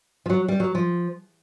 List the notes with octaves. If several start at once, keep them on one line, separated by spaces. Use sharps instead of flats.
F3
F#3
G3
F#3
F3